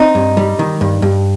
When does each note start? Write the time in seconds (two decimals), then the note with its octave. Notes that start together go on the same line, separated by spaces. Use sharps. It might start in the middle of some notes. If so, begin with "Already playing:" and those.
Already playing: C4 D#4
0.15 G2
0.37 G3
0.59 D#3
0.81 G2
1.02 G2